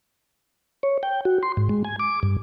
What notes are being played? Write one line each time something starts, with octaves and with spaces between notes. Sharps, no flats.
C#5
G5
F#4
C6
G#2
G#3
G#5
D6
G2